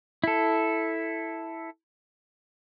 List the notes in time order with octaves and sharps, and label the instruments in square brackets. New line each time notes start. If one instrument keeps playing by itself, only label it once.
[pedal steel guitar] E4 A4